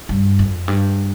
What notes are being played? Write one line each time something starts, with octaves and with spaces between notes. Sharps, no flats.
G2
F2
G2